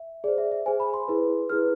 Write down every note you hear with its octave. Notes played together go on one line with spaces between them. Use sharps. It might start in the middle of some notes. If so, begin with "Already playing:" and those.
Already playing: E5
G#4 C5 D5
E5
E5
G#4 C5 G#5
B5
C6
E4 G#4 B4
E4 G#4 B4 F6